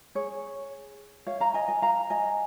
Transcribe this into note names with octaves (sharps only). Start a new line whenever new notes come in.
G#4 C#5
C#5 F5
F5 A#5
D#5 G#5
D#5 G#5
F5 A#5
D#5 G#5